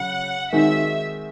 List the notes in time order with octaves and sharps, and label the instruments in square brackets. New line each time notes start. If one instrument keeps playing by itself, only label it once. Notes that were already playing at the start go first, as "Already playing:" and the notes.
Already playing: [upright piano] C#3 F#3 [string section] F#5
[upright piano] D#3 G#3 C4 D#4 F#4 [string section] E5